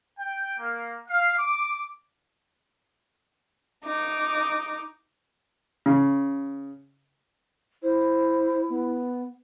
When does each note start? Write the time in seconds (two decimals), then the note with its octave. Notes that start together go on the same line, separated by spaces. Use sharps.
0.18 G5
0.58 A#3
1.08 F5
1.37 D6
3.85 D#4 D6
5.86 C#3
7.83 E4 C5
8.70 B3